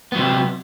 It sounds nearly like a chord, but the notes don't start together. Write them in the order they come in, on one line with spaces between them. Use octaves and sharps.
B3 F#3 C3